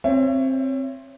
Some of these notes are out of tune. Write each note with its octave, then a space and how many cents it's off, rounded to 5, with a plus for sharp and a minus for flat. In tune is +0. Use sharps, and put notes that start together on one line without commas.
C4 +15 C#5 +10 E5 +30